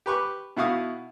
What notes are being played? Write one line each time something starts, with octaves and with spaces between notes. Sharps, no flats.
G4 B4 C#6 D6
B2 E4 F#4 F5 C#6 D#6